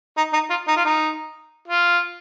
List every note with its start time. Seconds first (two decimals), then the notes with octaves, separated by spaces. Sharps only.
0.17 D#4
0.33 D#4
0.50 F4
0.68 D#4
0.77 F4
0.85 D#4
1.68 F4